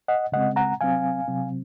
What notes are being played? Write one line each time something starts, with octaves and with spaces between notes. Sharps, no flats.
D#5 F#5
C#3 G#3 C4 D#5 F#5
F#5 A#5
C3 F#3 C4 F5 G#5
C3 F#3 C4